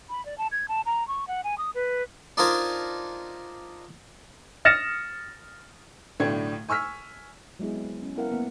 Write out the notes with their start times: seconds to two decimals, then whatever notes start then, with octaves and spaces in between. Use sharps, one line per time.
0.09 B5
0.25 D5
0.38 A5
0.52 G#6
0.68 A5
0.86 A#5
1.08 C#6
1.27 F#5
1.44 G#5
1.58 D#6
1.75 B4
2.37 D4 D#4 F4 A#4 C5 G#5
4.65 D#6 F6 A6 A#6 C#7 E7
6.20 B1 A2 D3 D4 G5 G#6
6.69 G#5 C#6 E6 F6 B6
7.59 F#3 G#3 B3 E4 G#4
7.75 C4
8.02 C#4
8.16 B3 C4 E4 A#4 F5 F#5
8.32 A#3 B3